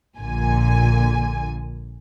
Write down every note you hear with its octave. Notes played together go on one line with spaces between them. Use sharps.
A#1 A#2 D3 G#5